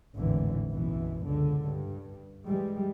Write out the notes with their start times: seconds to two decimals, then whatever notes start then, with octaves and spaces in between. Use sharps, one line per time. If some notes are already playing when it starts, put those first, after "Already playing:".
0.16 G#1 E2 A2 D3 E3
0.70 B1 F#2 B2 E3
1.24 C#2 D3
1.64 G2
2.46 E3 G3 G#3